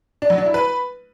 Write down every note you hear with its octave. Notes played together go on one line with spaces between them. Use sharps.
D4
F#3
D4
E4
B4